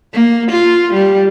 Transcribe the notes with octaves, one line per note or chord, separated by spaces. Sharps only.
A#3
F4
G3